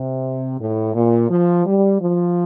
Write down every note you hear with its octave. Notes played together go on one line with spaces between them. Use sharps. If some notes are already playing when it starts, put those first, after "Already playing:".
Already playing: C3
A2
A#2
F3
G3
F3